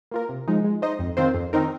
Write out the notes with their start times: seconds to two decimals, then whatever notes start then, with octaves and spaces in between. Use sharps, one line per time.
0.11 A#3 F4 A#4
0.29 C3
0.48 F3 G#3 D#4
0.64 G#3
0.82 D#4 C5 D#5
0.99 F2
1.17 D#3 C4 F4 C5
1.34 F2
1.53 D#3 C4 D#4 A#4